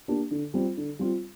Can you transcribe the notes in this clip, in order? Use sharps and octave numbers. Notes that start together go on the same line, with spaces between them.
A#3 D4 G4
D3
G3 C4 F4
D3
G3 C4 F4